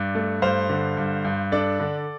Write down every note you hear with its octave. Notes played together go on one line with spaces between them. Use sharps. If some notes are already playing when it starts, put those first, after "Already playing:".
Already playing: G2 D5
A3
G2 C5 F5
D3
G2
G2
D4 A4 D5
D3